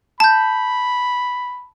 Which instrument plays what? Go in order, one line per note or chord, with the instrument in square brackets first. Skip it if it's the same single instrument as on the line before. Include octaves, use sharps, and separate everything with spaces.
[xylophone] A5 G6 [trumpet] B5